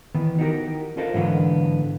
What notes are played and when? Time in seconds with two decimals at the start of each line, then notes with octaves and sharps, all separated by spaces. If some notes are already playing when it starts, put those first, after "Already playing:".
0.15 D#3 E3 B3
0.39 D#4 F#4 G4 A4 A#4
0.97 F4 A4 A#4 C5 D#5 F5
1.14 G#2 D3 E3 F#3 B3 F5